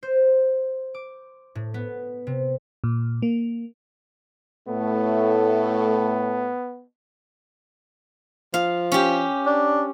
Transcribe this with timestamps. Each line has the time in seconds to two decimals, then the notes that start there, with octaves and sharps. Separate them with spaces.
0.03 C5
0.94 D6
1.55 A2
1.74 B3
2.27 C3
2.84 A#2
3.22 A#3
4.68 A2 A3 B3
8.54 F3 F5
8.92 C#4 G4
9.46 D4